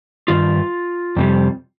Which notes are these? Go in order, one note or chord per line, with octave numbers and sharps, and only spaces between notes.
G2 D#3 F4
F2 C3 G3